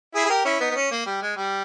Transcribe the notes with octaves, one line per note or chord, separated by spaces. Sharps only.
E4 G#4
G#4
G4 A#4
C#4 E4
B3 D#4
B3
C#4
A#3
G3
G#3
G3